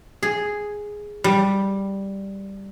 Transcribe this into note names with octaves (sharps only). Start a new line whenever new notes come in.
G#4
G3